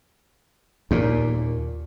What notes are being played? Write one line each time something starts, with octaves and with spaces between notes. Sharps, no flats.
D#2 A#2